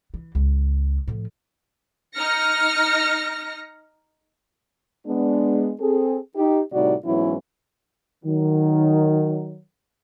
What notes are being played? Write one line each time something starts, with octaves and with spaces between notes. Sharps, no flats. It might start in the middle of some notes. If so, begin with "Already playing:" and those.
E3
C#2
A2 F3
D#4 F6 A#6 C#7
G#3 B3 D4
C4 G#4 A4
D#4 G4
A2 C3 G3 D#4 F#4 D5
G#2 E3 F#3 B3 C#4 E4
D#3 F#3